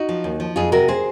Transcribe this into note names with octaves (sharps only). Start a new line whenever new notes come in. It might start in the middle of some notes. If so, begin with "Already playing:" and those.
Already playing: D#4 F#4
F3
D#2
F3
F2 F4 G#4
C3 F#4 A#4
G#4 C5